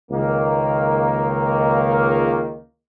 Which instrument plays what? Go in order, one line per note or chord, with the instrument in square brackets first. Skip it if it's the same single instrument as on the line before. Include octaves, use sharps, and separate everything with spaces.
[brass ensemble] C#2 D#3 A#3